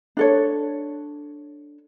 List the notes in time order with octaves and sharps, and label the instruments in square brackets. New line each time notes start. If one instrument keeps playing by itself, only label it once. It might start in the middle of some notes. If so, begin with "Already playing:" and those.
[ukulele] D4 A4 C#5